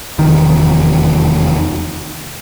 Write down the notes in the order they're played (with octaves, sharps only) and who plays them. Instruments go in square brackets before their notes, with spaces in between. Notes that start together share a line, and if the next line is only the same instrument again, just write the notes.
[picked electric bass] F1 E2 D#3